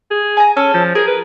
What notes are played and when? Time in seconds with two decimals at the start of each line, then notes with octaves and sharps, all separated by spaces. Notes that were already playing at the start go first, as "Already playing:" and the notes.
0.11 G#4
0.37 G#5 A#5
0.57 C#4 A4
0.74 F3
0.95 G#4 A#4
1.07 B4